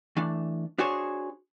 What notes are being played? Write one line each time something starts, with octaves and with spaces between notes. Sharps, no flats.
E3 A3 D4
D4 F#4 G#4 C5 C#5